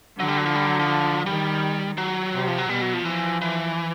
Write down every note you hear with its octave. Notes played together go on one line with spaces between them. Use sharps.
D3 F#3
G3
F#3
F3
G3
F#3
F3
D#3 G3
F#3
C3
F3
F#3
B2 G3
F#3
F3
E3 F3
E3